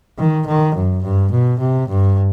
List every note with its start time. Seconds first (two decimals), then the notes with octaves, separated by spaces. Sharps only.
0.19 D#3
0.47 D#3
0.75 F#2
1.04 G2
1.32 B2
1.60 C3
1.89 G2